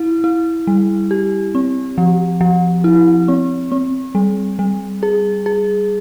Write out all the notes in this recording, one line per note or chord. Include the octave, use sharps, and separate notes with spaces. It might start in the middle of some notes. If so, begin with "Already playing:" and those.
Already playing: E4
E4
G3
G4
C4
F3
F3
E4
C4
C4
G3
G3
G#4
G#4